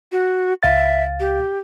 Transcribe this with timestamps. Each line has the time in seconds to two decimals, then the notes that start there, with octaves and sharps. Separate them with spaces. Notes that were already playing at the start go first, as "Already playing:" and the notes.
0.12 F#4
0.63 C#2 E5 F5 A6
1.20 G4